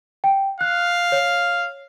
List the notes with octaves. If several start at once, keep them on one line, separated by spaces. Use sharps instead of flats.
G5
F5 F#6
C#5